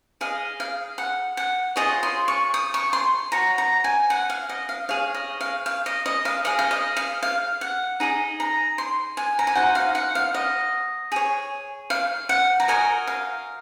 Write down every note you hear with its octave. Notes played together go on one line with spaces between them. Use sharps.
G#4 D#5 F5
F5
F#5
F#5
F4 G#4 C#5 D#5
C6
C#6
D#6
C#6
C6
F#4 C#5 A#5
A#5
G#5
F#5
F5
D#5
F5
G#4 C#5 F5
D#5
F5
F5
D#5
D#5
F5
G#4 D#5 F5
F5
D#5
F5
F5
F#5
D#4 G#4 D#5
A#5
C6
G#5
A#5
G#5
D#4 F#4 C5 D#5 F#5
F5
F#5
F5
D#5
G#4 C#5
F5
F#5
A#5
F#4 A#4 D#5 G#5
F5